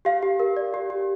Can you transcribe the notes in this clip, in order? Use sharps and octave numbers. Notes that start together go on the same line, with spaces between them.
G4 F5
G4
A#4
D5
G4
G4